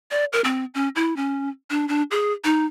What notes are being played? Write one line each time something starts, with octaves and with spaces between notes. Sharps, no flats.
D5
A#4
C4
C#4
E4
C#4
D4
D4
G#4
D#4